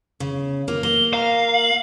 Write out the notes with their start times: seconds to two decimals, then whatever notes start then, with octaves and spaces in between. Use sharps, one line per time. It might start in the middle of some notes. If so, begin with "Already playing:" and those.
0.20 C#3
0.68 A#3 F4
0.83 A#3 G7
1.13 F5 A#5
1.54 F#7